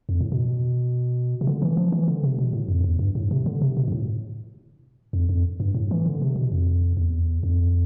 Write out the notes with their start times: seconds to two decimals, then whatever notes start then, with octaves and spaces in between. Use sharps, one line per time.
0.09 F2
0.21 A2
0.32 B2
1.41 C3
1.47 D3
1.62 E3
1.77 F3
1.92 E3
2.08 D3
2.23 C3
2.39 B2
2.53 A2
2.68 F2
2.84 E2
2.99 G2
3.15 A2
3.31 C3
3.46 D3
3.61 C3
3.77 B2
3.88 G2
3.92 A2
5.13 F2
5.29 F2
5.60 G2
5.74 A2
5.91 E3
6.06 D3
6.22 C3
6.36 B2
6.52 F2
6.97 E2
7.43 F2